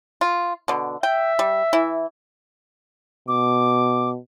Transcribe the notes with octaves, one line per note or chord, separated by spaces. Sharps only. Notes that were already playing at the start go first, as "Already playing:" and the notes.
F4
B2 D3
E5 G5
G3
E3 E4
B2 D6